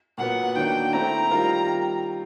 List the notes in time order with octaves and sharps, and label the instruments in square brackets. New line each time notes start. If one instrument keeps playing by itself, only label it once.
[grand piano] A#2 F#3 B3 [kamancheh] F#5
[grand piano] D#3 F#3 A#3 D4 [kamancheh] G5
[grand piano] A3 C4 E4 [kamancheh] A#5
[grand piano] D#3 G3 C4 F4 A#4